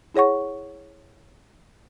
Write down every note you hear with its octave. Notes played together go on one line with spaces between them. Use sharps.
E4 G#4 C#5 F#5 C#6